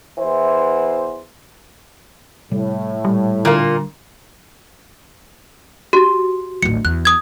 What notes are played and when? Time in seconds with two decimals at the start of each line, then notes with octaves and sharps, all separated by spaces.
0.19 E2 E3 C5
2.51 A2 C3 G3
3.05 A#2 G3
3.45 A#2 D3 A#3
5.93 F#4 G4
6.62 D1 A1 C#7
6.85 E2 F#6
7.05 D#6 G#6